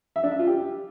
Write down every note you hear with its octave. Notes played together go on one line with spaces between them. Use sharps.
E5
D4
E5
F4
G4